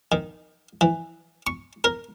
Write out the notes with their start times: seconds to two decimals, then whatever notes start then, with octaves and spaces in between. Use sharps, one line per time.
0.12 D#3
0.81 E3
1.47 C#6
1.84 A#4